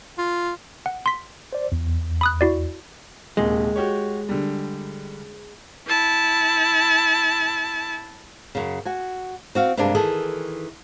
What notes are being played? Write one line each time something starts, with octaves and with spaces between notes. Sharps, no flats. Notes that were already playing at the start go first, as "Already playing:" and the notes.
F4
F#5
C6 B6
C5 D5
E2
B5 D#6 F#6
E4 F#4 D5
D#1 D#2 C3 G#3
F#4 G4 C#5
D3 G3
E4 A5
F#2 C#3
F#4 G#5
C4 F#4 F5
G2 C3 G#3 A#3 D4
D#3 E3 G#4 A4